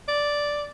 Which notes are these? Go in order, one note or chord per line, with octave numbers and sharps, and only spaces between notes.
D5